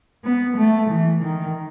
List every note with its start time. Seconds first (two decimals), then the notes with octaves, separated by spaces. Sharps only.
0.24 B3
0.57 A3
0.90 E3
1.24 D#3